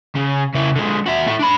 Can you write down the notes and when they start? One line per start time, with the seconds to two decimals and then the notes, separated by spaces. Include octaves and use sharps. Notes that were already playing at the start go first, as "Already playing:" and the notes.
0.16 C#3
0.54 C#3 E4
0.76 D3 G#3
1.06 F#4 E5
1.26 A3 E4
1.39 D4 B5